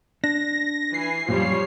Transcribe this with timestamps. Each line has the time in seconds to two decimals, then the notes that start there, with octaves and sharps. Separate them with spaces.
0.24 D4 A#6
0.94 E3 G#5 C7
1.29 F#2 A#2 F3 G3 C#5